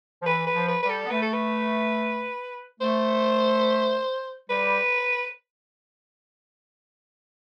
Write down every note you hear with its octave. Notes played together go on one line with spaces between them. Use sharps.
F3
E3 B4
B4
F3
B4
G3 B4
A4
B3
A3 B4
A4
B4
A3 C5
G3 B4